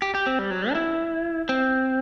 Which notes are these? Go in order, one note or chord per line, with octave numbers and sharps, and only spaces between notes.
G4
G4
C4
G3
F#3
D#4
E4
C4